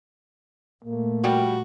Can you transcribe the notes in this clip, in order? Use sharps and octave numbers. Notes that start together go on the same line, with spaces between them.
A#2 A3 A#3
F3 G3 F#4 G4